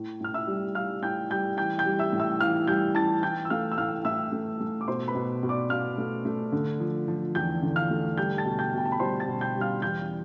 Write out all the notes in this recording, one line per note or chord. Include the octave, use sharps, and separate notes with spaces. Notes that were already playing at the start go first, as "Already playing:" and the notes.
Already playing: A2
A2 F6
E5 E6
G3
G3 F5 F6
A2 G5 G6
G3 G5 G6
E3 G5 G6
G5 G6
G3
E5 E6
A2
E5 E6
E3 F5 F6
G3 G5 G6
E3 A5 A6
E3 G5 G6
E6
A3 F5 F6
E6
A2 F5 F6
A2 E5 E6
A3
A3
D6
B2 C5 C6
B4 B5
B2
B2
D5 D6
B2 F5 F6
A3
A3
D3
F3
F3
E2 G5 G6
D3
F5 F6
A3
G3 G5 G6
A5 A6
B2
G5 G6
B2 G5
A5
B5
G3 C5 C6
A5 A6
B2
G5 G6
G3
F5 F6
E2 G5 G6